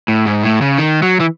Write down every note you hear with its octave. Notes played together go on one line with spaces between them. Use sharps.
A2
G#2
A2
C#3
D#3
F#3
E3